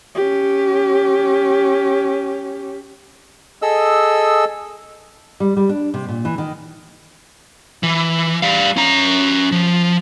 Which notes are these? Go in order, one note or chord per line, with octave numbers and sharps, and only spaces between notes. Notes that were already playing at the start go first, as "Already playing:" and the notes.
C#4 G4
G#4 A4 D#5 E6
G3
G3
D4
C3
A#2
E3
D#3
E3
G3 F5
C#4 A#5
F3